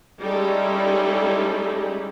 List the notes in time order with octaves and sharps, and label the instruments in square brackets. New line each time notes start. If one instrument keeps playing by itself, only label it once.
[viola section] G3 G#3 C#4 D#4 E4 A4